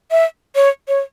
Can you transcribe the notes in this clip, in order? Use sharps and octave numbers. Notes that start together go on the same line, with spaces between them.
E5
C#5
C#5